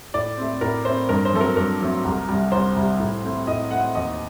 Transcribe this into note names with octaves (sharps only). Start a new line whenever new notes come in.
A2 D5
A3 C4
A2 A#4
A3 C4 C5
G2 A#4
C5
F#3 A3 C4 A4
A#4
G2 A#4
F#3 A3 C4
C2
C3 G3
C2 C5
C3 G3
A2
A3 C4
A2 D#5
A3 C4 F#5
D#2 D#5